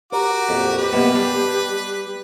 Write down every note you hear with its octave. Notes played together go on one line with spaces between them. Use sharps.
F#4 G4 A#4 D6
A#1 F2
B4
F#2 B2 A#3 B3
G3 D4